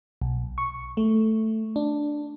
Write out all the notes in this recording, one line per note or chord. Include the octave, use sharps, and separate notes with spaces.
B1
C#6
A3
D4